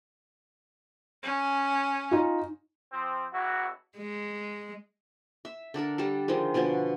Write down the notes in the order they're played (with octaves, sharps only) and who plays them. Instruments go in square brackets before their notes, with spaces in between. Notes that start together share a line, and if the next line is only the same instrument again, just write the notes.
[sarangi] C#4
[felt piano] D#4 F4
[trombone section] F3 C4
G#1 E4 F#4
[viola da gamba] G#3
[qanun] E5
D3 D4 A4 A#4
G3 G4 A4
D3 D#3 F3 G#3
B2 D3 F3 B3